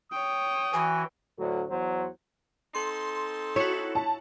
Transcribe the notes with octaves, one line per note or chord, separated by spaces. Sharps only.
C#5 G5 D#6
E3 F#4 G#5
D2 A2 D3 F#3
E2 F#3 C5
C4 D#4 A4 C6
E4 F#4 C#5
A5